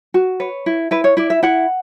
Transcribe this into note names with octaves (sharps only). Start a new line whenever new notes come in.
F#4
B4 C#5
E4
E4 B4
C#5
E4 D5
E5
E4 F#5